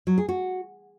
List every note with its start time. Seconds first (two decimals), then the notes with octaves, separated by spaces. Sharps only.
0.07 F#3
0.18 G#4
0.29 F#4